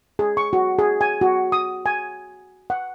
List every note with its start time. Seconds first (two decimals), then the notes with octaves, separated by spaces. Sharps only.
0.19 G#4
0.37 C#6
0.53 F#4
0.79 G#4
1.01 G#5
1.21 F#4
1.52 D#6
1.86 G#5
2.70 F#5